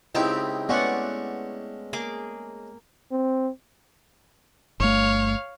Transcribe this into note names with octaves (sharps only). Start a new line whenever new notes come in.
C#2 C4 D#4 E4 G4 G5
G#3 A3 B3 C#4 D5 F#5
A#3 G#4 D6
C4
G1 A3 C#5 F5